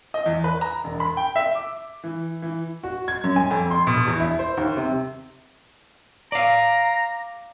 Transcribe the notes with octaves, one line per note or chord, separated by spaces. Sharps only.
D#5
E2
B4
A#5
E1
B5
G5
E5
D6
E3
E3
F#4
G#6
F#2
G#5
F2
C6
B2
E2
E4
C5
D#2
C3
D5 F5 A#5